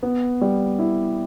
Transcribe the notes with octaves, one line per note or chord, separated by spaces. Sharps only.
B3
G3
E4